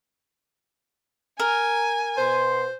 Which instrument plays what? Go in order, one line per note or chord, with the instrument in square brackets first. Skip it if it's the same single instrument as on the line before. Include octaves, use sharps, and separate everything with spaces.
[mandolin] A#4 [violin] G#5
[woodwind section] B2 C6 [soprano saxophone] C5